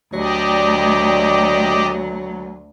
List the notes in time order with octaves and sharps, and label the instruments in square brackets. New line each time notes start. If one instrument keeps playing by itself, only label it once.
[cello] D2 [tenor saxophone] F#3 [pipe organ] G4 D5 D#5